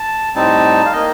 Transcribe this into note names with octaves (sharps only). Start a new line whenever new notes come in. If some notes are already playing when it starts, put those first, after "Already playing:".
Already playing: A5
A2 G3 C4 D#4 A5
F5
D#3 A#3 D#4 D#5